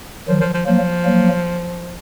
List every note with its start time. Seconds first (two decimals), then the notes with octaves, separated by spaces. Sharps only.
0.28 D#3 F3 F#3
0.41 F3
0.54 F3
0.66 F3 F#3 A#3
1.05 F#3 A#3